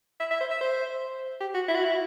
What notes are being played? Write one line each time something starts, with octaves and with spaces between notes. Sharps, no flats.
E5
E5
C5
E5
C5
G4
F#4
E4
F#4
E4